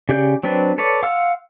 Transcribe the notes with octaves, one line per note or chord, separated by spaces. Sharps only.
C#3 G4 D5 G6
F#3 C4 D4 B4
A4 B4 C#5 D5
F5 F#5 C6 E6 F6